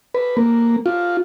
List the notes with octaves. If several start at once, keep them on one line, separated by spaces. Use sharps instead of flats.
B4
A#3
F4